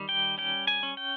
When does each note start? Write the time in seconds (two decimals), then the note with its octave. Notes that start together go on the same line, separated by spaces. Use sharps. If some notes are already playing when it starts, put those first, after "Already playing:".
Already playing: D#3 G3
0.09 G5
0.38 C#4 G5
0.67 G#5
0.83 C#4
0.97 G5